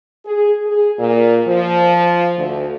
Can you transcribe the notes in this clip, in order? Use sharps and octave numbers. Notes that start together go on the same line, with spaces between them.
G#4
G#4
A#2
F3
D2